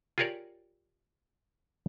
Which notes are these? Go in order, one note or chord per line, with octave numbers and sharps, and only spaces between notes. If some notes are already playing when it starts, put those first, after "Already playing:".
F4 G4 G#4 A#4 C#5 D5